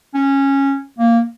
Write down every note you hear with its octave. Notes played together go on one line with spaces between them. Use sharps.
C#4
A#3